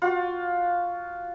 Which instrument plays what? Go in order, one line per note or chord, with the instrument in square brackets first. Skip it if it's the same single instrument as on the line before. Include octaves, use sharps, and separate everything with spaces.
[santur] F4 F#4